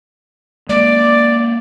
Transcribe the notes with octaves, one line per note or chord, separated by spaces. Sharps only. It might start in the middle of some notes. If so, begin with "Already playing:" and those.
G#3 A#3 D5